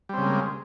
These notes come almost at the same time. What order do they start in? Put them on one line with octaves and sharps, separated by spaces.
G3 C4 C#3 G#3 A#3